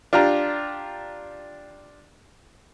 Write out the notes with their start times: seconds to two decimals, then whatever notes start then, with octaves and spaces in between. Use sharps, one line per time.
0.13 D4 F4 G4 A#5